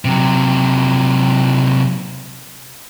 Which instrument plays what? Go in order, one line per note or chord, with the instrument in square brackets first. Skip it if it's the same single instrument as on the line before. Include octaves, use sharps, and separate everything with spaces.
[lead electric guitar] C3 F#3